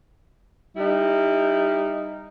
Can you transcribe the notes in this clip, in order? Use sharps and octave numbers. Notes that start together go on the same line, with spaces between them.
G3 D#4 E4